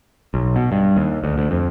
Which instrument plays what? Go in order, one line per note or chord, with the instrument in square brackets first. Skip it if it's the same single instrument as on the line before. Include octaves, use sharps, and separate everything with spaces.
[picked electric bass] B1
B2
G2
D#2
D2
D2
F2